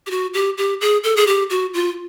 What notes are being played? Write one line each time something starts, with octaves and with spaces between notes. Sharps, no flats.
G4
F#4
G4
G4
G#4
A4
G#4
G4
F#4
F4